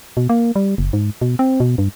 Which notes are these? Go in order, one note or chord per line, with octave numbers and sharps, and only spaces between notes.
B2
A#3
G3
F#1
G#2
B2
C4
B2
G2